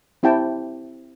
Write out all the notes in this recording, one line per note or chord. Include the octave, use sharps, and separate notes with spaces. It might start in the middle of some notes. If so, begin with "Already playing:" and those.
C4 E4 G4 G5 A5